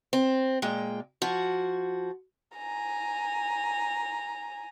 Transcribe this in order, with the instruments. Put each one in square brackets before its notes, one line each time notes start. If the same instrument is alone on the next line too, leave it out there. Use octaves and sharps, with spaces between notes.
[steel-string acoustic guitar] C4
A#2 G#3 G5
F3 F#4
[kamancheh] G#5 A#5